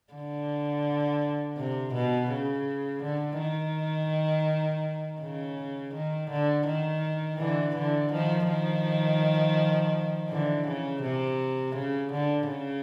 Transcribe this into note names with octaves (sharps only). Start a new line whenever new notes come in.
D3
C3
B2
C#3
D3
D#3
C#3
D#3
D3
D#3
D3 E3
D3 E3
D#3 F3
D#3 F3
D3 E3
C#3
C3
C#3
D3
C#3